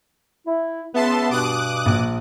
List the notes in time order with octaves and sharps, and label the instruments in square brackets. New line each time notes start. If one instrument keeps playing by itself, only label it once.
[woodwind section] E4
[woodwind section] C#2 E5 [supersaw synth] B3 A5 C6
[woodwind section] G2 B2 [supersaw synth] D6 D#6 F#6
[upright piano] A#1